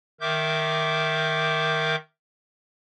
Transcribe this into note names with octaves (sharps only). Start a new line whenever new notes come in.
D#3 A#4 E5 D6 G6